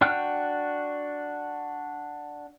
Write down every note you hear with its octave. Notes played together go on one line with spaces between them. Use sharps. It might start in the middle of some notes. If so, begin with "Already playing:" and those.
D4 F#4 G5 F6 F#6